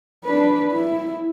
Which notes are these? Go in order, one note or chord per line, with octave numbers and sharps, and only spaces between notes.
D4 B4
E4